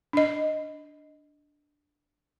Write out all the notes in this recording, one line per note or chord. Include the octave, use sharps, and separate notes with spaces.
D4 D#5